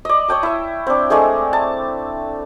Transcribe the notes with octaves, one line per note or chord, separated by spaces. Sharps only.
D5 D#5
C#5 D#5 G5 A5
E4 E5
C4 D4
G#3 A3 D4 G#4
A5